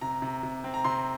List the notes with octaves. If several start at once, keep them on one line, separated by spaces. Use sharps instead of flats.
C3 A#5
C3
C3
C4
A#5
C3 C6